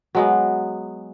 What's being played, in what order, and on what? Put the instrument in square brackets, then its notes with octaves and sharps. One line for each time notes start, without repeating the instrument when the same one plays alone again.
[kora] F#3 G#3 B3